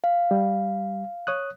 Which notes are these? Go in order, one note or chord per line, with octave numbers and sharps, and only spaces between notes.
F5
G3
C#5 D#6 F#6